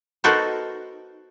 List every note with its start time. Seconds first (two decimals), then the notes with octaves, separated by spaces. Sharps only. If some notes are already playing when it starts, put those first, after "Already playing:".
0.24 B3 D#4 F#4 A4 A#4 C5